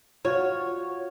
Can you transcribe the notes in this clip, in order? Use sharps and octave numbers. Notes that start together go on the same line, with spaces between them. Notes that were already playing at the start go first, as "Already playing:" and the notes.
F4 F#4 C#5